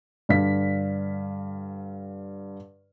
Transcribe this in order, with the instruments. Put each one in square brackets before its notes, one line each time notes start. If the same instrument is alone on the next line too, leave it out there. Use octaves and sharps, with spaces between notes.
[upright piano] G2 D3 F5 B6